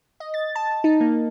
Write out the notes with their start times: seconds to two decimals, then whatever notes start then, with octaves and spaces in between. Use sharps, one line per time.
0.20 D#5
0.34 A6
0.55 A5
0.84 D#4
1.00 A#3